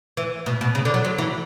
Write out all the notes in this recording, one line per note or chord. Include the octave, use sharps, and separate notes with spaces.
E3
B2
B2
C#3
D3
F#3
F#3
E3